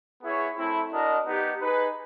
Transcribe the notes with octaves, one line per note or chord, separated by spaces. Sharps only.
B3 E4 G#4 C#5
A3 C4 E4
D4 F#4 A#4 D#5
B3 D#4 G4
D#4 G#4 B4